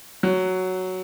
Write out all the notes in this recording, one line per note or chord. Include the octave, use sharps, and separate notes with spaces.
F#3